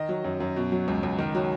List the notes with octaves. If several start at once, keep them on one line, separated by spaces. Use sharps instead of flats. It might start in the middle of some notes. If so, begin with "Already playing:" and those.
Already playing: D#3 D#5
F#3
F#2
F#2
B2
F#3
C#2
C#2
D#3
F#3